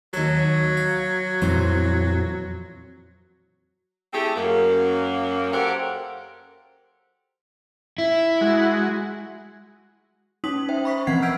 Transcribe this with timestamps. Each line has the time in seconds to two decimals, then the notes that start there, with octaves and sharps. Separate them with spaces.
0.14 D#2 F#3 A4
0.77 F5
1.42 F2 A#2 E3 C5
4.13 A3 C4 E4 G4 G#4
4.36 F#2 A#3
5.53 F#3 G4 A4 A#4 C5 F#5
7.98 E4
8.41 G#3 F#4
10.44 C#4 D#4 D#6 B6 F#7
10.69 C5 E5 G5
10.85 B5 C#6 B6
11.07 E3 F3 C4 F#5 G#6 C7
11.22 E6 F6 G6 G#6 B6 D7